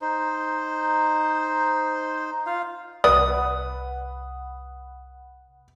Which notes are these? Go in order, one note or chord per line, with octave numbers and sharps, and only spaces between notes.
D#4 C5
F4 F5
C2 B4 D5 F#5 D#6